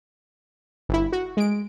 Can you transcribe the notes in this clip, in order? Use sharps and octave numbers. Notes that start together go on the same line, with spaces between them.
G1 E4
F#4
G#3 D7